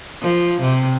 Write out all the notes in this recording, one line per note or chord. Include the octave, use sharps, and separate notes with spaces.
F3
C3